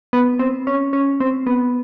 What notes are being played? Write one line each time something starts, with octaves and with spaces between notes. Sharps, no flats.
B3
C4
C#4
C#4
C4
B3